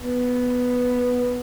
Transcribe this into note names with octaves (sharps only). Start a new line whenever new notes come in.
B3